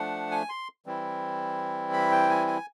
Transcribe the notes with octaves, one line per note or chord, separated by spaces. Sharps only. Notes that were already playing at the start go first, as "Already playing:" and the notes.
Already playing: F3 A3 D4 F#5
G#5
C6
E3 G3 C4 E4
B5
G5
G#5
G#5